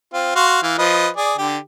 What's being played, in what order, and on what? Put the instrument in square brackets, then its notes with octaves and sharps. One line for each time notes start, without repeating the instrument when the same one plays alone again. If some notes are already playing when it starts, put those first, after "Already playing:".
[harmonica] C4 F4
F#4 F5 C6
E3 F5
F3 B4 D#5
G#4 D5
D3 G4